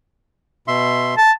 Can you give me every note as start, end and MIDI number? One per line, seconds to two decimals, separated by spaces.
0.68 1.15 47
0.68 1.15 76
0.68 1.15 84
1.18 1.31 81